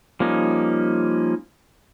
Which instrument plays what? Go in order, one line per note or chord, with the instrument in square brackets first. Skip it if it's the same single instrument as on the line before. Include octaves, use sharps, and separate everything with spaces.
[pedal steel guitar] F3 G3 A#3 C#4 D#4